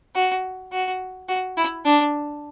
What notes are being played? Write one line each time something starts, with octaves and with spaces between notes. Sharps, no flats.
F#4
F#4
F#4
E4
D4